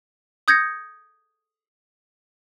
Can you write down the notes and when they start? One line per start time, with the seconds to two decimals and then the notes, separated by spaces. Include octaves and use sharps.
0.48 D#6 G6 G#6 A#6 C#7